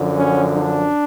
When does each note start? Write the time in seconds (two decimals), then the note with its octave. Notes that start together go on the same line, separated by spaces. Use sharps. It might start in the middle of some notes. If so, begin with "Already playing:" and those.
Already playing: F#2 D3 F3
0.17 C#4
0.57 D4